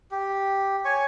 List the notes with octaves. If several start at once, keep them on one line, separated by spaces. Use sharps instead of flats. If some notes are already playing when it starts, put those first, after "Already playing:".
G4
C#5 G#5 C#6